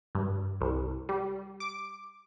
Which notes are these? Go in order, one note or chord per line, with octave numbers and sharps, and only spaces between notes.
G2
C2
G3
D6